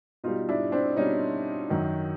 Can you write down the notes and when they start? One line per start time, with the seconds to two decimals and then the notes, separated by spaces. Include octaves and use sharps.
0.24 B2 G3 D#4 F4
0.49 D4 E4
0.72 C4 D4
0.97 B2 G3 C#4 D#4
1.70 F#2 D#3 F#3